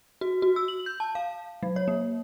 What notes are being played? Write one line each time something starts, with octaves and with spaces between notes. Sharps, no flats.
F#4
F#4
E6
F#7
G6
A5
F5
F#3
C#5
A#3